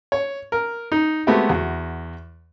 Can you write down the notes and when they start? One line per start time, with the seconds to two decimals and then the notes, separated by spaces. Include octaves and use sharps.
0.12 C#5
0.52 A#4
0.92 D#4
1.27 G#3 A3 B3 C4 F#4 G4
1.49 E2 F#4